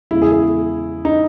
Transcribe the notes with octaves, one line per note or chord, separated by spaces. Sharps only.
E2 C#3 G#3 E4
G#4
G#4
D#4